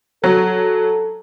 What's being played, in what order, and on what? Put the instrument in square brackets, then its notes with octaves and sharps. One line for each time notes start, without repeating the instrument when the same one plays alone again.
[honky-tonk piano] F#3 [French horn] A4